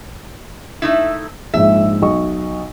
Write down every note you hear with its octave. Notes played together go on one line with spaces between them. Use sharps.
A3 D#4 E4
A#1 G#2 E5
B1 D#5 C#6